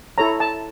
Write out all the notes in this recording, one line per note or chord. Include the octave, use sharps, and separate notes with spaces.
E4 A4 C#5 A#5
A5